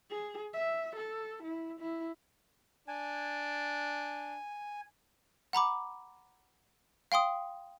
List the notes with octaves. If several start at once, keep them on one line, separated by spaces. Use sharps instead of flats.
G#4
E5
A4
E4
E4
D4 G#5
F#5 A#5 B5 D6
F5 G5 C6 D#6